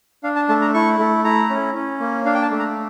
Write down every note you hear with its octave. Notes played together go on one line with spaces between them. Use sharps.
D4 F5
A5
A3 A5
A#5
E4 C#6
A3
E4 A#5
C#4
C#4
A#3
D4 F5
G5
A5
A3
A#5